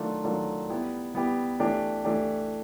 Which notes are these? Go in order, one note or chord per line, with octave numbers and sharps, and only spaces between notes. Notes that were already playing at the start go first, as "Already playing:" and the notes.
Already playing: D#3 F#3 A3 D4 F4
D#3 F#3 A3 D4 F4
G3 B3 E4 G4
G3 B3 E4 G4
E3 A3 D4 G4
E3 A3 D4 G4